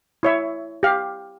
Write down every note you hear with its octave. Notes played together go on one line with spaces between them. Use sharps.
E4 C#5 E5
G4 F5